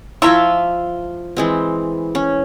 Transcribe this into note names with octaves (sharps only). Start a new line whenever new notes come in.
F3 E4 F4 E5 A#5 C#6
E3 G#3 C4
C#4